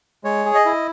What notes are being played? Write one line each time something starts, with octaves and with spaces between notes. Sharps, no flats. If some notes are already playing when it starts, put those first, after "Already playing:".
G#3 C#5
G#4
D#5
E4